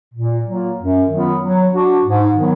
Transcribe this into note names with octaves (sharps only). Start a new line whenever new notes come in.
A#2
F#3 A#3 F4
F#2
D#3 F#3 B3 F4
F#3
D4 F#4
G#2
D#3 F#3 B3